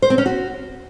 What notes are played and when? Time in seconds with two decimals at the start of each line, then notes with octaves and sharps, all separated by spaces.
0.02 C5
0.10 C4
0.18 C#4
0.26 F#4